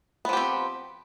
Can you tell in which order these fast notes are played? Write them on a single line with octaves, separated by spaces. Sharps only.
B3 F3 G4 C4